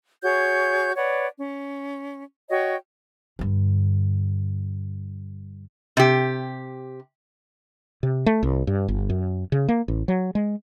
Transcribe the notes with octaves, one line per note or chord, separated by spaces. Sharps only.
F#4 G#4 C#5 G6
B4 C#5 D5 F#5
C#4
F#4 C#5 D#5 G5
G2 D3
C3 G4
C3
A3
C2
G2
G1
F#2
C#3
A#3
A1
F#3
G#3